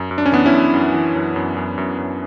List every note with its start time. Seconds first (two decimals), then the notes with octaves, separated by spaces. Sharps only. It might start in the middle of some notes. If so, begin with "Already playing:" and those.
Already playing: F#2
0.11 F#2
0.18 D4
0.26 C#4
0.32 E3 B3 D4
0.46 C#4 E4
0.52 F#2
0.74 F#2
0.94 E3
1.15 F#2
1.36 F#2
1.57 F#2
1.78 F#2
1.98 F#2